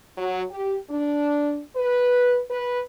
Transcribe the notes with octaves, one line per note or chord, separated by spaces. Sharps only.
F#3
G4
D4
B4
B4